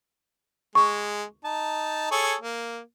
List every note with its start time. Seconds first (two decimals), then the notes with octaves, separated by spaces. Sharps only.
0.75 G#3 C#6
1.45 D#4 A5
2.11 G#4 A4 C#5
2.41 A#3